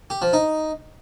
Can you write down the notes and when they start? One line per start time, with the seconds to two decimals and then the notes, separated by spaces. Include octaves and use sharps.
0.10 G4
0.22 F3
0.33 D#4